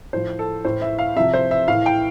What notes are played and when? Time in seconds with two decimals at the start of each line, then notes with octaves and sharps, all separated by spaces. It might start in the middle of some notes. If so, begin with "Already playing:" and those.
0.13 A2 F3 C5
0.39 A4
0.65 A2 E3 C5
0.82 E5
0.99 F5
1.16 C3 F3 E5
1.34 C5
1.51 E5
1.68 A2 E3 F5
1.86 G5